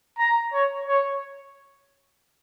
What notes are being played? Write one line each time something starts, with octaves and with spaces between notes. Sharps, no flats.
A#5
C#5
C#5